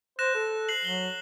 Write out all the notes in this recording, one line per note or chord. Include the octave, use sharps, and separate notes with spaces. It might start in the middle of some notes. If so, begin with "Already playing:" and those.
C5 F#6 A#6 E7
A4
F#6 C7 F#7
F#3 G7